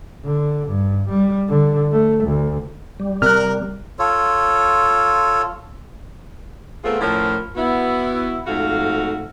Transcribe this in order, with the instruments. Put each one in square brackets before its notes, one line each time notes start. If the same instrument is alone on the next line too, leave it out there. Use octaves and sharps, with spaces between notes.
[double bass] D3
G2
G3
D3
A3
D2
[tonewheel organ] G3
[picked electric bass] C3 [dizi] A#4 [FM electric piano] F6 F#6
[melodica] F4 A4 C#5
[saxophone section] A3 B3 C4 F4 G#4 A#4
A2 F3 C#4 E4 A#4
B3 E4 F#4
F2 G#2 A3 F#4 F5